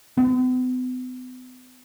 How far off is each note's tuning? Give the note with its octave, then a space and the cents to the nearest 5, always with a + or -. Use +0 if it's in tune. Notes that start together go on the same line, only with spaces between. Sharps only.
B3 +45